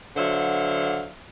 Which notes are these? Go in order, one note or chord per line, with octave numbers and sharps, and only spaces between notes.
D3 F#3 C5 E5 F5